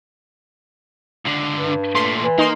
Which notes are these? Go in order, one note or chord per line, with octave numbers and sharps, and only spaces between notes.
C#2 D3
G2
A#2 A3 C6
E3
A#3 D#4 C6